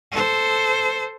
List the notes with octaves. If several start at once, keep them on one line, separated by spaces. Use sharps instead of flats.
A4 C5